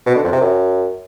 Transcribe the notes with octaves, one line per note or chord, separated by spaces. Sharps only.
B2
D3
F2
C3
F#2